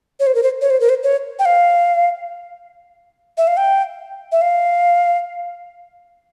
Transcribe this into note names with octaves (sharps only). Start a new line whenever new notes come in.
C#5
C5
A#4
C5
C#5
C5
A#4
C5
C#5
G5
F5
E5
F5
G5
E5
F5